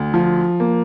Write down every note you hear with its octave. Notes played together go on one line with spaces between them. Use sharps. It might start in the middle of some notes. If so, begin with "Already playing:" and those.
Already playing: D2
F3
A#3